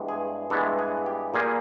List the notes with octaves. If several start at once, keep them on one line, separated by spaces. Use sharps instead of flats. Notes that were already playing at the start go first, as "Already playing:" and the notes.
Already playing: G2 E3 G#3 B3
G#4
G2 E3 G#3 B3 A4
G#4
G4
A#2 G3 A#3 G#4